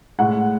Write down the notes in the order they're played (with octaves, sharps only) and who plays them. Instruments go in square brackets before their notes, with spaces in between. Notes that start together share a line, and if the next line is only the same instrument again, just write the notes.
[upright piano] A2 G#3 F#5